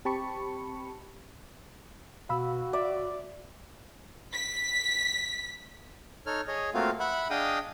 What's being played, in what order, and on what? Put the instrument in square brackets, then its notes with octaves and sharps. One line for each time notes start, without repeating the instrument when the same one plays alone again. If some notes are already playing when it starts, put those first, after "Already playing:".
[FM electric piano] C4 G4 A5 B5 C#6 C#7
[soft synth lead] B2 [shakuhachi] F#4 [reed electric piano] F5 B5 E6
[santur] D5 [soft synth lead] E5
[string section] B6
[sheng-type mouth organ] D#4 A4 C#5 F6
G#4 C#5 D#5
A3 A#3 C4 F4 F#4 F5
E5 F#5 B5
D4 G#4 D#5 F5 G5 D#6